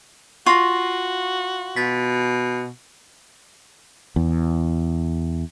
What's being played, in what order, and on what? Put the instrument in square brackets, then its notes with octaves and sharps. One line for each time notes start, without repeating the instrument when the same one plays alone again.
[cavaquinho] F4 [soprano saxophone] F#4 [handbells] C#6 A#6
[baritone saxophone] B2 [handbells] A6 B6
[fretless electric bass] E2